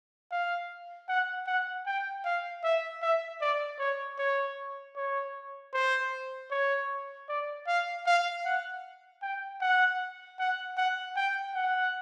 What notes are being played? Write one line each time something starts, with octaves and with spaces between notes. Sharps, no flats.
F5
F#5
F#5
G5
F5
E5
E5
D5
C#5
C#5
C#5
C5
C#5
D5
F5
F5
F#5
G5
F#5
F#5
F#5
G5
F#5